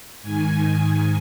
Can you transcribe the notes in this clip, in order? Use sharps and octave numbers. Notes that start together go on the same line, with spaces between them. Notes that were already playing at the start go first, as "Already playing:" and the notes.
G#2 D#3 G#5